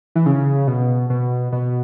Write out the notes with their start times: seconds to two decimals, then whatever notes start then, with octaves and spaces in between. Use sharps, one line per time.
0.15 E3
0.26 C#3
0.67 B2
1.10 B2
1.52 B2